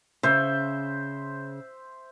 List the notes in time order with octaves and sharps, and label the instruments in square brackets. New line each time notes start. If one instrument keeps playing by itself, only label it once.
[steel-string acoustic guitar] C#3 [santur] C5 E5